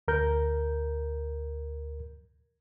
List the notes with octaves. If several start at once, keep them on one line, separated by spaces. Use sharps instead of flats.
D2 A#4 G6